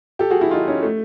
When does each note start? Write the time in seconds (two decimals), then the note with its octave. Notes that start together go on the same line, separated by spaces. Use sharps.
0.19 G4 A4
0.31 F#4 G#4
0.41 E4 F#4
0.51 D#4 F4
0.67 C#4 D#4
0.83 A3